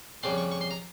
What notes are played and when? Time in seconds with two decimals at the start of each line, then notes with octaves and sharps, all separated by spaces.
0.23 F2 C#3 G3 C6
0.38 C#6
0.52 C#6
0.61 C6
0.71 A#5